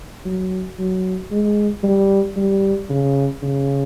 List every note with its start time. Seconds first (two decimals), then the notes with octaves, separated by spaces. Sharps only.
0.25 F#3
0.79 F#3
1.31 G#3
1.83 G3
2.36 G3
2.89 C#3
3.43 C#3